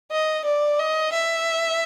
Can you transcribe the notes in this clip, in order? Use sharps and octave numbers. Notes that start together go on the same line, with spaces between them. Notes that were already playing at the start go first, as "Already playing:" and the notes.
D#5
D5
D#5
E5